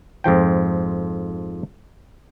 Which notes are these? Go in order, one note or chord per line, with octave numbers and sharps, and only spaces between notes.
F2 G#2 F3 G5